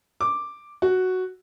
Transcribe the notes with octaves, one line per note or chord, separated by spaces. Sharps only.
D6
F#4